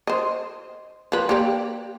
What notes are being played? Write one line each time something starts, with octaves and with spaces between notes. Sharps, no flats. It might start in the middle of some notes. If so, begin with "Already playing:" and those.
C5 D#5
F3 B4
A#3 G4 D5